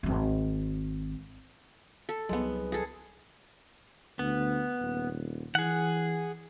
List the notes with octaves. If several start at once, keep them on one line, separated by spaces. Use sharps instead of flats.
D1 G#1
A4
C2 F#3 G#3 B3
G#4 A4
D2 B3
D#1
E3 G#4 F#5